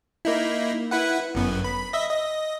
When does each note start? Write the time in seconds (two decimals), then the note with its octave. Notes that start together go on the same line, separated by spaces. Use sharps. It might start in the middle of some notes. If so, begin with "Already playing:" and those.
0.25 A#3 D#4 E4
0.91 E4 B4 F#5
1.35 G1 F#2 B3
1.64 B5
1.93 D#5 E5
2.10 D#5